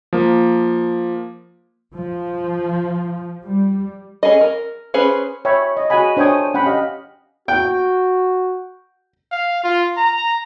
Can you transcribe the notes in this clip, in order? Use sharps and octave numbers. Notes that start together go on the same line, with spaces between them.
F3 A#3
F3
G3
C#4 G#4 A4 D#5
A#4
C#4 G#4 B4 C5
C#5 E5 G5 B5
D#5
F#4 G#4 D#5 F#5 G#5 B5
D4 C5 C#5 G5 G#5 D#6
C#4 F#5 G5 B5
G4 D#5 F5
F#4 G5
F5
F4
A#5